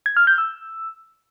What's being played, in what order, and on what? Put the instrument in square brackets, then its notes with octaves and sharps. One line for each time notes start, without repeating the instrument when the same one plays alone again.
[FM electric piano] G#6
F6
G6
E6